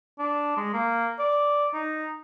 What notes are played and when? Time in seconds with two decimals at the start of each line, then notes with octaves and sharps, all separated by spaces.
0.19 D4
0.57 G#3
0.73 A#3
1.19 D5
1.73 D#4